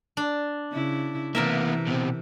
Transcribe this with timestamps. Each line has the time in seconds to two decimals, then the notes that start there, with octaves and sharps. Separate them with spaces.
0.17 D4
0.73 C#3 E4
1.35 C3 E3 A#3 B3 A#4 E5
1.87 B2 C4